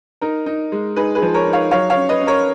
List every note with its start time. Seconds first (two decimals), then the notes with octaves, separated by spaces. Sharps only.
0.21 D#4 A#4
0.46 D#4
0.72 G#3
0.96 D#4 G#4 B4
1.15 G#4 B4
1.22 F3
1.34 A#4 C#5
1.47 D#4
1.53 C#5 F5
1.71 F#3 C#5 F5
1.90 C#5 F5
1.96 C#4
2.09 B4 D#5
2.22 C#4
2.27 A#4 C#5